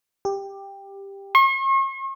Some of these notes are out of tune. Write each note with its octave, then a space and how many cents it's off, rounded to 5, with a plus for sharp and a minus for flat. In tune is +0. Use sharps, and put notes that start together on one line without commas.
G4 +10
C#6 -45